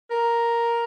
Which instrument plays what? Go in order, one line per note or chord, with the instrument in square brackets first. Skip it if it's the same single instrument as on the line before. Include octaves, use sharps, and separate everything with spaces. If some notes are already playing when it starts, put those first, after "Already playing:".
[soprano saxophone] A#4